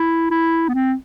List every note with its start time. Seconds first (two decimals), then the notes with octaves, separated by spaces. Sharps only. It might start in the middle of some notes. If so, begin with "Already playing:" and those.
Already playing: E4
0.31 E4
0.68 B3
0.74 C4